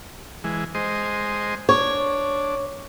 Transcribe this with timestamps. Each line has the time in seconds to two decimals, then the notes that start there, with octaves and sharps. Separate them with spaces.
0.44 E3 G#3
0.75 G#3 C5 D#5
1.69 D4 C#5